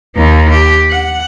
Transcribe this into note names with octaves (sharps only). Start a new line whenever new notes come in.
D#2 D#4
G4
F#5